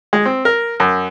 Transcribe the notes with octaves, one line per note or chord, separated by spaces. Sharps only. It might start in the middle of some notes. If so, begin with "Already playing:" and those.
G#3
C4
A#4
F#2